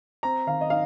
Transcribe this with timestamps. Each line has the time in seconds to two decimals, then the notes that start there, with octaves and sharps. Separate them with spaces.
0.23 C4 A#5
0.47 D#3 F5
0.61 D#5
0.70 D#4 F5